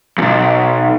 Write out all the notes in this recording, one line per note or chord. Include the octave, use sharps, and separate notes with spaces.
B1 E2